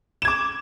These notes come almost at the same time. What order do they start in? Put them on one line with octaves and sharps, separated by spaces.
E7 G#6 D6